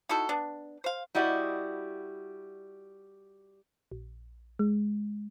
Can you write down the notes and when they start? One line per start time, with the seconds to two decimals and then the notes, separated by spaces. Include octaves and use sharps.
0.09 D#4 E4 F#4 A4
0.29 B3 D4
0.84 C5 F5
1.15 G3 E4 F#4 D5 D#5
3.92 A#1
4.59 G#3